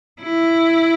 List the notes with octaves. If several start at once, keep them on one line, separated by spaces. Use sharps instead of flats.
E4